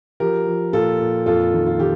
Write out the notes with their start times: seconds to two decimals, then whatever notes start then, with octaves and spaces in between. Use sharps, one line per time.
0.20 F3 G4 A#4
0.46 F3
0.73 A#2 F4 A4
1.00 A#2
1.26 F2 F4 A4
1.53 D#3
1.66 F4
1.79 D#3 G4